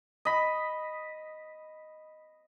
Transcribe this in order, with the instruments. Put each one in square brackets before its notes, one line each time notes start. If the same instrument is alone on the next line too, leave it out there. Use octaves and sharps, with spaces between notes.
[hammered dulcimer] D#5 B5